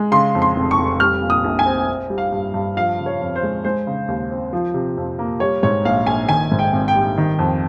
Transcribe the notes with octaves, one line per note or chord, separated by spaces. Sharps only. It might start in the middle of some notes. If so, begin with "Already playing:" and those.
Already playing: G#3
C#3 C6
F2
C6
F1
C#6
F1
G3 F6
A#2
D#6
A#1
G#5
C4
C4
G3
F5
G2
G2
F3 F5
C#3
C#5
F2
C5
G#3
G#3 C5
C#3
D#2
C4
F3
C3
F2
A#3
G3 C#5
G#2 C#5
A#1 F5
A#1 G#5
D#3 G#5
G#2
G5
G#1
G5
G3
D#3
F2